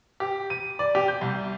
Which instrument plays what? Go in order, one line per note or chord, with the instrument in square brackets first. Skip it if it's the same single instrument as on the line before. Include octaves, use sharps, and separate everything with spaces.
[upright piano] G4
D#7
D5
G4
G6
C2